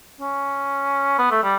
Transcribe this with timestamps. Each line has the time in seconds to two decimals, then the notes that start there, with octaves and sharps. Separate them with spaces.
0.21 C#4
1.18 B3
1.31 A3
1.43 G3